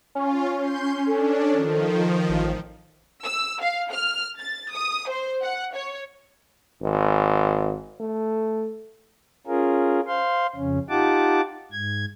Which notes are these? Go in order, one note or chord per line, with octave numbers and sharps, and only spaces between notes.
C#4 F4
C6 G6
D4 A4
D#3 F3
A1
E6
F5
F6
A6
D#6
C5
F#5
C#5
G#1
A3
C#4 F4 G#4 A#4
C5 F5 C6
F2 C#3 C#4
D#4 F4 G4 F#5 A5 D6
G#2 G#6